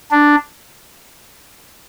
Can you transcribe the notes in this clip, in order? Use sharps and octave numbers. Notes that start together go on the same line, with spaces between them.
D4